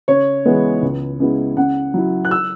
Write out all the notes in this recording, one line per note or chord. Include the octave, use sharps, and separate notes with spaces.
C#3 C#5
E3 G#3 B3 E4
C#2
C#3 G#3 B3 E4
C#3 F#5
F#3 E4
F#6
E6